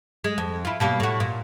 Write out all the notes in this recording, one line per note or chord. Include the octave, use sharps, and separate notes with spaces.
G#3
F2
E4 F4
B2 G3 A#3
A2 F#4
A#2